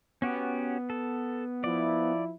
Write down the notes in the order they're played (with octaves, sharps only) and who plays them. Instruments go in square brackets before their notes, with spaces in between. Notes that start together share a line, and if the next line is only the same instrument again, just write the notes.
[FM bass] B3 [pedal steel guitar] C#4 F#4 G4
[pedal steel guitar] A4
[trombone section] F3 E4 [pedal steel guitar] D5